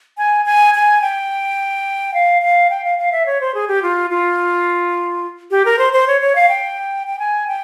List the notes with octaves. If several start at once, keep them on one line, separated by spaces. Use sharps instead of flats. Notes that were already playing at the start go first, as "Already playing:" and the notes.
G#5
G#5
G#5
G5
F5
F5
G5
F5
F5
E5
C#5
C5
G#4
G4
F4
F4
G4
A#4
C5
C5
C#5
C#5
F5
G5
G5
G#5
G5